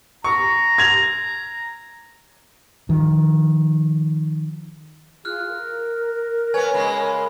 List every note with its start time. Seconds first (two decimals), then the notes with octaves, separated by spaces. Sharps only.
0.24 A#5 C#6
0.78 G#6 F7
2.89 D#3 F3
5.25 F4 G#4 F6 F#6
5.48 A#4
6.54 B3 B4 C#5 G#5
6.74 C#3 G#3 A#3 B5